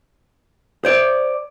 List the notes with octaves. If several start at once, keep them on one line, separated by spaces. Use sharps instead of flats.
C5 D5